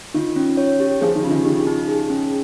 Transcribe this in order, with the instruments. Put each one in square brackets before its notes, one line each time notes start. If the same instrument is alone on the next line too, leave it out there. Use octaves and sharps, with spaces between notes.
[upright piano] D#3 [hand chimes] F4
[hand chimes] C#4
C#5
G4
[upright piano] F3 [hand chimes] G#4
[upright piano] D#3
[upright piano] C#3 [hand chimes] F4
[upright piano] D#3
[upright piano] D#3 [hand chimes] G4
[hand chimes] D#4
G#4
C#4